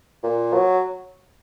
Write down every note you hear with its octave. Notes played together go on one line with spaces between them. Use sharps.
A#2
F#3